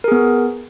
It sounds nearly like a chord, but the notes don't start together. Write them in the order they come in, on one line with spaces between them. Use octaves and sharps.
A#4 G#4 B3